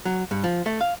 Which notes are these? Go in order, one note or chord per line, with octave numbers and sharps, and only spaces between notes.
F#3
G2
F3
A3
F5